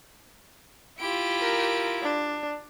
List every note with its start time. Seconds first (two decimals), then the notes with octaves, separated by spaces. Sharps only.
1.00 E4 F4 G4 D7
1.41 A#4
2.03 D4